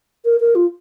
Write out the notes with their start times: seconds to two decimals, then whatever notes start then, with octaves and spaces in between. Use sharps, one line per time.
0.25 A#4
0.40 A#4
0.55 F4